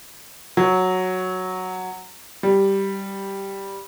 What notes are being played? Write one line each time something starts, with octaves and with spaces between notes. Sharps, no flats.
F#3
G3